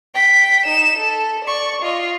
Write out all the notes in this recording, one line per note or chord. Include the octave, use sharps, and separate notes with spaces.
G5 B6
D#4 E7
A4
D5 C#6
F4 D#5